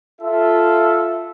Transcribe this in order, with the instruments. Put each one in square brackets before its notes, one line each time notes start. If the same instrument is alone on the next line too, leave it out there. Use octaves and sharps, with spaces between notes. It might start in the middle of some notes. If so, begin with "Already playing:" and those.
[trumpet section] F4 A4 E5